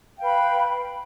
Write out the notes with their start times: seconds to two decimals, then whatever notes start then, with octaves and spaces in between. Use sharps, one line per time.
0.15 G5
0.18 F5
0.21 B4
0.24 B5